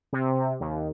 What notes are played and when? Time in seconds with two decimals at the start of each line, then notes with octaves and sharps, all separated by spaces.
0.13 C3
0.60 D#2